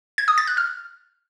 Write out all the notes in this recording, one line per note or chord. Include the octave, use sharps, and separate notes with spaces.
G#6
D#6
A6
F#6
F6